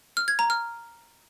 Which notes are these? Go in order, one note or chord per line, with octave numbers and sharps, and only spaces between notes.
F6
G#6
A#5
F6